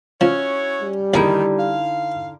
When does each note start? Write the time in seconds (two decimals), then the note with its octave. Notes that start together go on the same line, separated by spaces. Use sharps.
0.21 F3 C#4 E4 F#4 C#5
0.82 G3
1.14 D#2 D3 D#3 D#4 E4 G#4 D5
1.59 F5